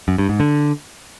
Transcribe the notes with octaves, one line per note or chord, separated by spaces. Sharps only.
F#2
G2
G#2
D3